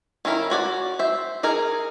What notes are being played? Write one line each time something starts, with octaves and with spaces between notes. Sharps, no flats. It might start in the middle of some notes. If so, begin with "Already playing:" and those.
D#3 C#4 E4 A#4 B5
C#4 F#4 D5
C5 E5
D#4 G#4 A#4 G#5